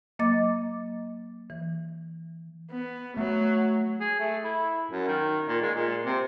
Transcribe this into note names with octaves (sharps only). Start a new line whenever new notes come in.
F#3 A#3 D#5 D6 A6
E3
B3
F#3 A3
G#4
A3
E4
F#2
D#3
A#2
G#3
A#2
C3